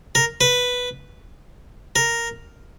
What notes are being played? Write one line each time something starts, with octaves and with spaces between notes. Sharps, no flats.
A#4
B4
A#4